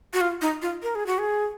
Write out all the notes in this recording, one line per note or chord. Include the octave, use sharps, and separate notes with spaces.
F#4
F4
D#4
F4
A#4
G#4
F#4
G#4